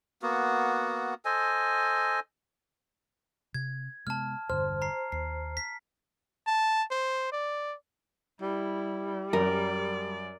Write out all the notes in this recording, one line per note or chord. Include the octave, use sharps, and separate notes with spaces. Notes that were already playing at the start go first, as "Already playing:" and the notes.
A#3 B3 F#4
A4 C5 D#5 G#5
C3 G#6
C3 G#3 B3 A5 F6
E1 G2 D3 C5 F6
A#5 C7
D#2 C7
B6
A5
C5
D5
G3 E4
F#2 A#4 D5